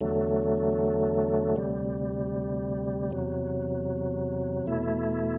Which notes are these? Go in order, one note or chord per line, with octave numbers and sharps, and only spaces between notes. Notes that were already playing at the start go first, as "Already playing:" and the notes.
E2 D3 F#3 A3
D2 C3 G3
E2 C3 F#3
E2 B2 A3 E4